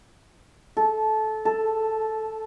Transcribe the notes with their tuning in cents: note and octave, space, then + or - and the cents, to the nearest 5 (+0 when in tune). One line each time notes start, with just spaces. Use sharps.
A4 -20
A4 +0